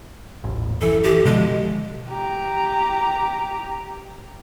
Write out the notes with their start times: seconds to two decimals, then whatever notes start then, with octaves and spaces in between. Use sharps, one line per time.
0.44 D#1 A1
0.81 F#1 E3 A4
1.04 G4
1.25 B2 D3 F3 G#3
2.09 G4 A#5